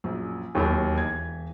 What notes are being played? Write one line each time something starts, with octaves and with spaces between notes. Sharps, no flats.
A#1 F#2
E1 D#2 E3 F#3 B5
G#6